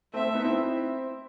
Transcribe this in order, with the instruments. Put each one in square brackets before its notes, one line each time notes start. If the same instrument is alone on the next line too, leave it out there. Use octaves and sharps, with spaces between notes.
[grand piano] A3 C4 [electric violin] E5
[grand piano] A3 C4
B3 D#4
C4 E4